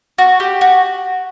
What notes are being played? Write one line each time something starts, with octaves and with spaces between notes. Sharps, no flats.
F#4
G4
F#4